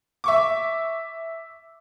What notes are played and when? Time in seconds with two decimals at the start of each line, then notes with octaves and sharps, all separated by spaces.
0.24 E5 C#6 D6